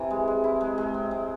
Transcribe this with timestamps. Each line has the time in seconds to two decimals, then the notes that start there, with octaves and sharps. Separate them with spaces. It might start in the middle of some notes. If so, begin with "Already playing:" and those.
Already playing: C3 E3
0.11 G#3
0.28 G#3
0.44 E4
0.61 G#3
0.78 G#3
0.94 C4
1.11 G#3